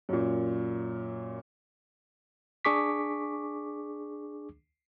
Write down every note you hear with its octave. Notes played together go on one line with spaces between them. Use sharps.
F#2 A#2
D4 G#4 C#6 D6 B6